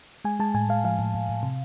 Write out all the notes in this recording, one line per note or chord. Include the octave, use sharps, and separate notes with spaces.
G#3 G#5
G#3 A5
A2 G#5
G#3 F5
F3 F5
A2
A2
A2
C3